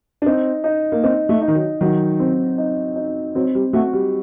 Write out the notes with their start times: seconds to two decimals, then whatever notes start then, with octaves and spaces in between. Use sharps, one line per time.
0.22 D4
0.26 C4 D#4
0.64 D#4
0.92 A#3
1.04 C4 D#4
1.29 A3
1.41 D#4
1.48 D#3
1.55 F#3
1.81 D#3 F#3
2.20 C4
2.58 D#4
2.96 D#4
3.35 F#3 C4
3.55 G3
3.73 A3 F#4
3.93 G3